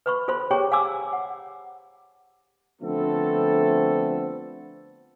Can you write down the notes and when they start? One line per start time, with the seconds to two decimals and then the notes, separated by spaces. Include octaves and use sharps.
0.06 B4 B5 C#6
0.28 F4 A4 C5 B5 C6
0.51 G4 G#4 C#5 G5 A#5 C#6
0.72 F5 G#5 A#5 D6 E6
1.13 F#5
2.81 D3 F3 A3 B3 C4 A4